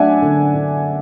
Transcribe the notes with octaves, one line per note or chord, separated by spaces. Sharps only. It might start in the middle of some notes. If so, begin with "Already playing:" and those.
Already playing: F#3 A3 D4 D5 E5 F#5 G#5
D3
D3